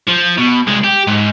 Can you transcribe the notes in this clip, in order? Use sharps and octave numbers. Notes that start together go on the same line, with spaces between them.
F3
B2
C2 G#3
G4
G#2